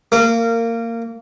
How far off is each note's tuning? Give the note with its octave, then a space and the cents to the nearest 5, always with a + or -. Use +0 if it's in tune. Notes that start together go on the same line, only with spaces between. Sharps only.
A#3 -20 A#4 -25 D6 +35